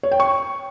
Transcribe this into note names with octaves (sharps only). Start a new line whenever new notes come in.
C#5
G5
C#6